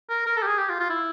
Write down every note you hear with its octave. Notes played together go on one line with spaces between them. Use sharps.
A#4
A#4
A4
G4
G#4
G4
F4
F4
E4